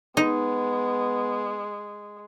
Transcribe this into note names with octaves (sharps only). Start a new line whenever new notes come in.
G#3 B3 D#4